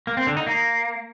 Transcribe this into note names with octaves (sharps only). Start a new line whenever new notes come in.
A#3
C4
D3
D#4
A#3